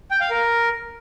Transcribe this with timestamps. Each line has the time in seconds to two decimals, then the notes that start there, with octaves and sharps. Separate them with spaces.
0.11 G5
0.21 F5
0.30 A#4